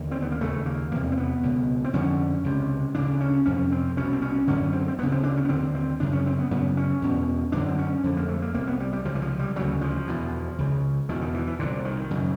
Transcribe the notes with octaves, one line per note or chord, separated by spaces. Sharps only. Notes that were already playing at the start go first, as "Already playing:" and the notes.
Already playing: D#2 D3
C4
B3
A#3
D#2 C#3 A3
A#3
E2 C3 A#3
C4
B3
C#2 B2
C4
F2 D3 C#4
C#2 C3
D2 C#3 D4
C#4
F2 C3 C#4
C4
C2 B2 C#4
C4
C#4
F#2 D3 C#4
C4
C4
D2 C#3 B3
C4
D4
C#4
B3
D#2 D3 C4
C4
F#2 C#3 D4
C#4
C4
B3
F#2 C#3 B3
C#4
E2 B2
F#2 D3 D4
C4
C#4
F2 D3
A#3
A3
A#3
C2 C3 A#3
B3
G3
G3
C#2 C3 F3
E3
F3
G3
D2 C#3 F#3
F3
E2 B2
C#2 C#3
E2 B2 D#3
D#3
E3
E3
C2 A#2 D3
D#3
F#2 C#3